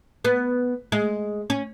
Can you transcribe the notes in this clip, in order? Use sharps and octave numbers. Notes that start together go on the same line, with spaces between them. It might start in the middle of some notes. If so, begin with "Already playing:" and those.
B3
G#3
C#4